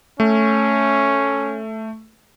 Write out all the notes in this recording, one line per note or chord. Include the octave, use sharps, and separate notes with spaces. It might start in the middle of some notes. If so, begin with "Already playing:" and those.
A3 C#4